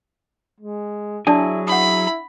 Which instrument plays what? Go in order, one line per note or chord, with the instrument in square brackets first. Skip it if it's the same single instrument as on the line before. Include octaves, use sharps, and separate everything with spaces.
[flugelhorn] G#3
[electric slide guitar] F#3 G#4 G#5 [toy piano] D4 D5 A5 [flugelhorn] E4
[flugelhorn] E4 [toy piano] F#5 D#6 [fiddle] B5